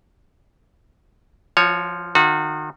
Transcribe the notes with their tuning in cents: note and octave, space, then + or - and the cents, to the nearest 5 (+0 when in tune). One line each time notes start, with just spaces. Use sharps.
F3 -10 F#4 -45 C#5 +0
D#3 -30 F#4 -30 E5 -5